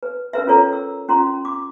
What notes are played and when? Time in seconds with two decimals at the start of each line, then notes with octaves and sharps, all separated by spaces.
0.03 B4
0.33 C#4 A#4 B4 E5
0.47 C#4 F4 A4 C#5 A#5
0.73 E6
1.08 C#4 F4 A#5 C6
1.45 D6